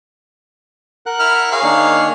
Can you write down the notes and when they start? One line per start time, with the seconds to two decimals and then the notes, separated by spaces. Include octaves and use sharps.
1.06 A#4 F#5 F#6
1.20 E4 F6
1.51 G#4 C#5 F5
1.63 D#3 A#3 D4